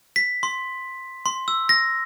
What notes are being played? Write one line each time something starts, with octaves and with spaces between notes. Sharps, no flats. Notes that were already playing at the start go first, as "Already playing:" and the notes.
B6
C6
C6
E6
A#6